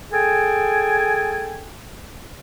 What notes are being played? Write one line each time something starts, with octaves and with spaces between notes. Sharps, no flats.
G#4 A4 G5 G#5